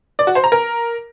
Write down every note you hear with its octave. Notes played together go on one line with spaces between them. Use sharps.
D5
F#4
C5
A#5
A#4